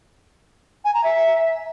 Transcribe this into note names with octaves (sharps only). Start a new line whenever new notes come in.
G#5
A#5
E5